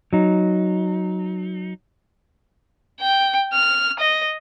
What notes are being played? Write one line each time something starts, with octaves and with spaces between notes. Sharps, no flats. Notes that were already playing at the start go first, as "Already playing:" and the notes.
F#3 D#4
G5
F6
D#5